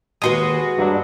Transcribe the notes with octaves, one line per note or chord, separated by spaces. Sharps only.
D#2 G#3 F#4 B4 C6 D#6
G2 F#3 D4